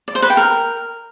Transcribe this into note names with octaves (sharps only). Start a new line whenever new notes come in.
D5
C5
B4
G5
A#4